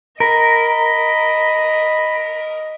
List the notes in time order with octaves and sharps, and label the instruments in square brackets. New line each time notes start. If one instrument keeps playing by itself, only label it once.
[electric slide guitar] A#4 [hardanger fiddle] D#5 [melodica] B5